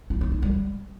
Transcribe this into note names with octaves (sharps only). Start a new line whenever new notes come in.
E4
D#4
D#4
G3